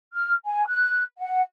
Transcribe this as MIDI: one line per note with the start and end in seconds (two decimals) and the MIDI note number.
0.14 0.34 89
0.46 0.66 80
0.68 1.02 90
1.18 1.41 78